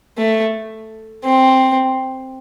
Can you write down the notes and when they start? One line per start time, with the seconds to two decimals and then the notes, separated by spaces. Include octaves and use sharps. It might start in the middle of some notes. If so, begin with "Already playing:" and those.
0.18 A3
1.24 C4